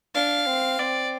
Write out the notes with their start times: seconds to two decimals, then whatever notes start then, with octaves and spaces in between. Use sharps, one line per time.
0.15 D4 F5
0.47 C4
0.79 C4 D5